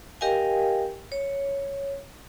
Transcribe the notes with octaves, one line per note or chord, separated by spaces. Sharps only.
G4 A#4 D#5 F5 G5 G#5
C#5